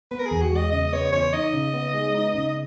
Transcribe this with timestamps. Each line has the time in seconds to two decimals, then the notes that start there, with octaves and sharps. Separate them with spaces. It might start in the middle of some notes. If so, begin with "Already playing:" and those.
0.11 B3 B4
0.19 A#4
0.26 G#4
0.31 E2
0.42 F#4
0.52 G#3 D#5
0.72 C#3 D#5
0.93 B3 C#5
1.12 E2 C#5
1.33 D#4 D#5
1.53 C#3
1.74 B3
1.94 G#3
2.14 D#4
2.35 C#3
2.49 D#5